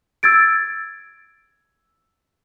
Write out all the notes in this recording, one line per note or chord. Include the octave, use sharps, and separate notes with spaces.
E6 G#6 A6 D7